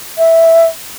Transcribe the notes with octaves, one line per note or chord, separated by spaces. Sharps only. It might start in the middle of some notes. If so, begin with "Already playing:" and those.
E5